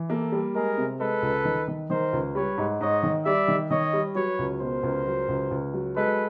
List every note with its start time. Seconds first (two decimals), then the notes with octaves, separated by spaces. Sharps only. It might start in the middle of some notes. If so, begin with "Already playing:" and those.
Already playing: E3
0.10 A#3 G4 A4
0.32 G3
0.55 G#3 G#4 A#4
0.77 C3
1.00 G#3 A4 B4
1.22 C#2
1.45 D#3
1.68 D#3
1.90 D#3 A#4 C5
2.13 C#2
2.35 G3 B4 C#5
2.58 G#2
2.81 G#2 C#5 D#5
3.03 D#3
3.25 G3 D5 E5
3.48 D#3
3.71 D#3 C#5 D#5
3.93 G3
4.15 F#3 B4 C#5
4.39 C#2
4.60 B2 A#4 C5
4.83 C#2
5.06 F#3
5.29 C#2
5.51 C#2
5.74 F#3
5.96 G#3 A4 B4